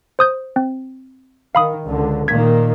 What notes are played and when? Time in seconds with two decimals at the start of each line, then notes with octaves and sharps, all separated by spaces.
0.19 C5 D#6 G6
0.56 C4
1.55 D#3 F5 B5 D#6
1.86 C#2 D3
2.28 A#2 D#3 A#3 G#6 B6